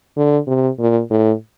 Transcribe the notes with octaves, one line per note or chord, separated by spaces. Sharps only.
D3
C3
A#2
A2